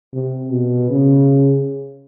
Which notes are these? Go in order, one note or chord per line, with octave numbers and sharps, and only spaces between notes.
C3
B2
C#3